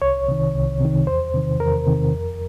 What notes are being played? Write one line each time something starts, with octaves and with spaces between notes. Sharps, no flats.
C2 C#5
C3 D#3
C2
C3 D#3
E2 C5
C3 D#3
E2 A#4
C3 D#3
F2